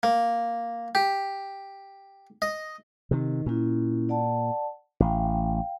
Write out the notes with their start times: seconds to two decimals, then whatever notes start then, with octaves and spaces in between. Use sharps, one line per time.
0.03 A#3
0.95 G4
2.42 D#5
3.11 C3 D#3
3.46 A#2 C#4 E4
4.09 D5 F#5 A5
5.00 A1 F5 G5